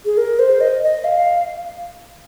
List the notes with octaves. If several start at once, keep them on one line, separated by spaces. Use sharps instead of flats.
G#4
A#4
C5
D#5
D#5
F5